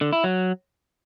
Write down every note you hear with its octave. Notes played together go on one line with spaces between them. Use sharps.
D3
E4
F#3